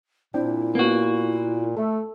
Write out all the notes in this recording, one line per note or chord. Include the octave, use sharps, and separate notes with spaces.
A#2 C4 D4 E4 G5
A#3 B3 C#4 F#4
A3 A4 E5